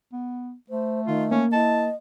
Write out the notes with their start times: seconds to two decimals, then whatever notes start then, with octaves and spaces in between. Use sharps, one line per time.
0.13 B3
0.70 A3 C5
1.07 D#3 F4
1.31 A#3 C#4
1.53 E4 D#5 A5